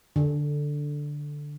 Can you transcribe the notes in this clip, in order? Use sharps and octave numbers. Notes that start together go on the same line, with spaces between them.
D3